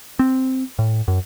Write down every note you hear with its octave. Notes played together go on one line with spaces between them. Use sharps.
C4
A2
F#2